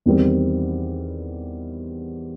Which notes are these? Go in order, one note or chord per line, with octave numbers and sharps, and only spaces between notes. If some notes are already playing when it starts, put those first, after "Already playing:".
E2 D#3 G3 C4